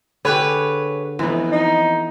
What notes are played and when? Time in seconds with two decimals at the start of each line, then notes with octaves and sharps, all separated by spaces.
0.25 D3 G4 G#4 B4 C#5
1.19 F2 E3 B3
1.52 D#4